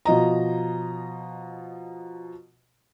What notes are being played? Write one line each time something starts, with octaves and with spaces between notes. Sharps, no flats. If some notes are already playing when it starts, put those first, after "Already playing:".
B2 F3 D#5 A#5